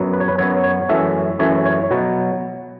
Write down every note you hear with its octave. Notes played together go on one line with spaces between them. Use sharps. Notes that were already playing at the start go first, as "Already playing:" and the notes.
Already playing: F#2 F#3 B3
B4
C#5
B4
F#2 F#3 B3 C#5
C#5
F#2 E3 A3 C#4 E5
F#2 E3 A3 C#4 C#5
C#5
B2 F#3 B3